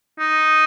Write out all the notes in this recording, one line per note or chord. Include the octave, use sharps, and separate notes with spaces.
D#4